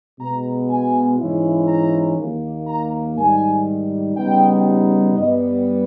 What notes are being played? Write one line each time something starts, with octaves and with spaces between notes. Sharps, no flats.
B2 G#3 B3 A#5
G#5
G#2 E3 G#3 C#4 E4
A#5
D#2 D#3 A#3
A#5
G#2 D#3 G3 G#5
C#3 G3 B3 D#4 G5
G2 G3 B3 D#5